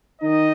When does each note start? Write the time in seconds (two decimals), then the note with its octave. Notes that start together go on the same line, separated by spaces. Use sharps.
0.21 D#3 D#4 D#5